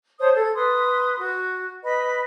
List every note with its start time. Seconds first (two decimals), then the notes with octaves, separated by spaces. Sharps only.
0.19 C5 C#5 A5 D#6
0.34 A4 G#6
0.54 B4 C6 D#6
1.18 F#4
1.83 B4 D#5 B5